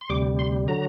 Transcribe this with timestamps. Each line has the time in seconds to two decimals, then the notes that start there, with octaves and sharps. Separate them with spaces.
0.01 C6
0.10 D2 C3 G3 D6
0.39 C6
0.68 D3 F#3 A#5